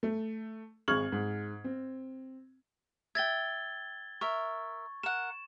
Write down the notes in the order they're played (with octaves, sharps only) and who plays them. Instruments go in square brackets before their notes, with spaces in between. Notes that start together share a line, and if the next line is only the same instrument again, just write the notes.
[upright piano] A3
G#1 G#3 C#6 F6 G#6 F#7
G#2
C4
[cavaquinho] E5 G5 [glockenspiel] G#6 A6 G7
[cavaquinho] A#4 E5 [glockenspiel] C#6
[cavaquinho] A#4 F#5 [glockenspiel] E7